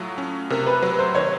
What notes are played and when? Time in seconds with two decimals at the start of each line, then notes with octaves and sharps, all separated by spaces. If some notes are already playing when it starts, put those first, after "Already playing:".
Already playing: A2 F#3 A3 F4
0.18 C#4
0.50 C3 A#4
0.66 B4
0.82 F#3 B4
0.99 C5
1.15 D#3 C#5